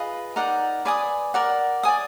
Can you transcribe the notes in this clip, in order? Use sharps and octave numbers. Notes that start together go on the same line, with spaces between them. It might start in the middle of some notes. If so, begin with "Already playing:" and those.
Already playing: F4 G#4 B4 D#5
D#4 A#4 D5 F#5
B4 D5 G#5 D#6
A#4 D5 F#5
D5 G#5 D#6